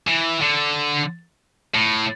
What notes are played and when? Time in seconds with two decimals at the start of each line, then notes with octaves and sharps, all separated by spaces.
0.08 E3
0.42 D3
1.74 A2